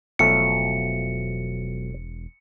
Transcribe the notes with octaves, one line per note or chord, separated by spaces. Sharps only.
E1 B1 B2 F3 F#3 A3 C#7